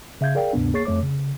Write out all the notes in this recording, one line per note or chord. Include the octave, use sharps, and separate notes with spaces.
C#3 E5 F5 G6 G#6
G#4 A#4 D5 F5 G5
D2 G2 C3 B3 D4
A#3 G#4 C#5 C#6 A6 C7
F2 A3 C#5 D6
C#3